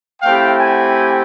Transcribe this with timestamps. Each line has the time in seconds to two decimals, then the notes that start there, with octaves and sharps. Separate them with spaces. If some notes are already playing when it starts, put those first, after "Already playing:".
0.22 A3 C4 E4 G4 F5 G5
0.59 F#5 G#5